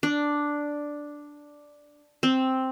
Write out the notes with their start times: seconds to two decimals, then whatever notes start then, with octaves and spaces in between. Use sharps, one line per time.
0.03 D4
2.23 C4